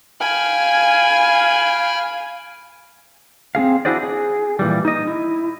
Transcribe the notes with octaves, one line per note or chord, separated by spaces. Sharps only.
F5 G5 G#5 B5 F6
C4 C#4 G#4 F5
D4 E4 F#4 G#4 C5 D5
G#4
A#2 E3 G3
D#4 D#5
E4